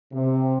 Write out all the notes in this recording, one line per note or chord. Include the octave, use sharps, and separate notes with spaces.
C3